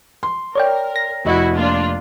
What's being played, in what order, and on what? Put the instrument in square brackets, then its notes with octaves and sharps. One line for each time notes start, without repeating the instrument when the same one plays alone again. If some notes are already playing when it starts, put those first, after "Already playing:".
[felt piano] C6
[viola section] A#4 [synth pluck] C#5 D5 G5
[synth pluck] A#6
[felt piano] F1 D#5 [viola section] E4 F#4
[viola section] A#3 D4 F4